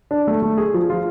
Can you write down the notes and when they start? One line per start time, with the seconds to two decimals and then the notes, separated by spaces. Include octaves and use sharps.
0.11 D4
0.27 A3
0.42 A3
0.57 G#4
0.74 F3
0.90 F4